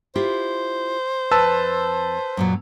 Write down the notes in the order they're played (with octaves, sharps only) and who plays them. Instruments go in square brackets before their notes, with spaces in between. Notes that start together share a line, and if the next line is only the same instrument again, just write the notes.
[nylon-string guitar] E4 F4 G4 [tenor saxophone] C5
[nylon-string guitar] F2 [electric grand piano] B4 A5 E6
[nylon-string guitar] F#2 A#2 F#3